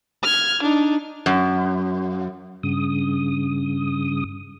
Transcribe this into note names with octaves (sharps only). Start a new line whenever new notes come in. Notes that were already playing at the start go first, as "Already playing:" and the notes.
F6 G#6
D4 D#4
F#2
G2 C#3 D#6